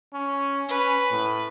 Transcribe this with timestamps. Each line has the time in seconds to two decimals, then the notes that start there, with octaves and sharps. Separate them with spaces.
0.14 C#4
0.69 C#4 B4
1.11 A2